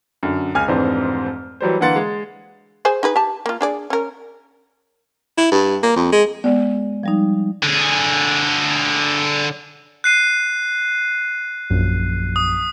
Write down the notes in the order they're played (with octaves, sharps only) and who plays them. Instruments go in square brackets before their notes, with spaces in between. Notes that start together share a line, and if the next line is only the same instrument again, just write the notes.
[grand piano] F#2 D3
C#2 G#5 F6
F1 F2 G#2 E3 D4 C5
E3 F#3 G3 C5
D3 E3 A#3 F#5 C6 A6
G#3
[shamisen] G#4 C5 G#5
D#4 G#4 B4
G4 A5
A#3 F4
D4 G#4 D5
C#4 A#4
[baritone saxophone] E4
G2
A#3
F2
G#3
[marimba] G#3 D5 [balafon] B3
[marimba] F3 G3 D#4
[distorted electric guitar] D3 G#4
[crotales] F#6 C7 D#7
[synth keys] A#1 F#2
[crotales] D#6